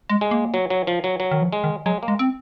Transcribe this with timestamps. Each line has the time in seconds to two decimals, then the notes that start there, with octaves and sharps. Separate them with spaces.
0.09 G#3
0.21 G#3
0.31 A#3
0.54 F#3
0.70 F#3
0.87 F3
1.04 F#3
1.20 F#3
1.31 D#3
1.42 F3
1.53 G#3
1.64 D#3
1.86 F#3 G#3
2.03 A#3
2.08 G#3
2.19 C4